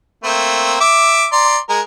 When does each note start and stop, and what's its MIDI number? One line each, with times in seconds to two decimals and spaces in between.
0.24 0.78 57
0.24 0.78 58
0.24 0.78 60
0.80 1.27 76
0.80 1.27 86
1.32 1.58 74
1.32 1.58 82
1.32 1.58 84
1.69 1.81 56
1.69 1.81 70